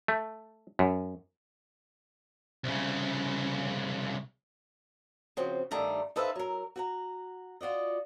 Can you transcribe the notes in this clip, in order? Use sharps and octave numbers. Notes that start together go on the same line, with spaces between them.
A3
F#2
C2 C#3
C#3 F3 C4 F#4
G2 D#3 G3 A3 F5 A#5
D#4 A4 B4 C5 E5 F5
F#3 A#4
F#4 F#5 A#5
F4 F#4 D5 D#5